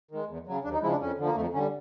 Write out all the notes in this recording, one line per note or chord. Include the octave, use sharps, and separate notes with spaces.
D#3 G#3
E2
C#3 F#3
D#2 D4
D#4
C#3 F3 G#3 E4
D4
F2 C#4
D3 F3
A#3
F2 A3
D3 G3 C#4